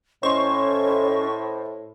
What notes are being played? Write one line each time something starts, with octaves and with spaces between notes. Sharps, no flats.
A2 C#4 C5 D#5 C6 C#6